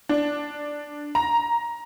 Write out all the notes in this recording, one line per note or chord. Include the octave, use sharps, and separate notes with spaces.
D4
A#5